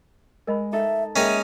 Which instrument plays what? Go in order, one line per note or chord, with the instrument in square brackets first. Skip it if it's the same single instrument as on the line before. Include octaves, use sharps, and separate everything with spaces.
[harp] G#3 [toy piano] A#4 D#5 B5
[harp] D#4 A4 [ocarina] E5
[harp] G#3 A#3 [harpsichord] C#4 D#4 G#4 [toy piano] A#4 G5 [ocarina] E5